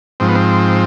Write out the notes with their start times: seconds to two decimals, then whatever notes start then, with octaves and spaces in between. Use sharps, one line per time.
0.20 G#2 F3 C4
0.28 B3
0.35 C4